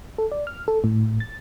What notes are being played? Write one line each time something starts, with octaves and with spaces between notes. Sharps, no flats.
A4
D5
F6
A4
A2
A6